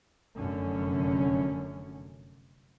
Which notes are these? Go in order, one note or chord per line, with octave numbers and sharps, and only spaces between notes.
F1 F#2 D3 C#4